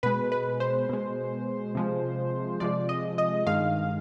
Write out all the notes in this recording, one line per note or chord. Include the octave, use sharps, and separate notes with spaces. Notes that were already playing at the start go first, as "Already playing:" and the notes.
B2 G#3 B4
B4
C5
B2 G#3
C3 F3 G#3
C3 F3 G#3 D5
D#5
D#5
G2 D#3 G#3 F5